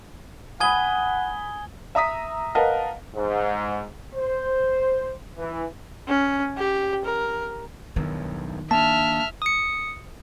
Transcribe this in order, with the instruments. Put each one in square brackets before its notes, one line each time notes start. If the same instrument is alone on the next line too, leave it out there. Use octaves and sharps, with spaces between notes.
[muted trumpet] F#5 [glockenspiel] G#5 G#6 G7 [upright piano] B5 D#6
[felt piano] E5 A#5 D#6 B6
A#4 B4 D#5 F5 F#5 A5
[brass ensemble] G#2
C5
E3
[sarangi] C#4
G4
A#4
[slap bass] B1 E2 G2 [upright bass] D#3
[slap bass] A#3 D4 [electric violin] E5 F6 [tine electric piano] A5
[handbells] D#6 C#7